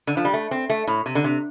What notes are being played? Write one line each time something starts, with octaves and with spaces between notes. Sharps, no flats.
D3
F3
G3
A3
C4
A3
A2
C3
D3
C3